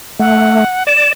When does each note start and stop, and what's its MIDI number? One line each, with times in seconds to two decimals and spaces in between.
0.20 0.64 57
0.20 0.83 78
0.87 1.13 74
0.87 1.11 100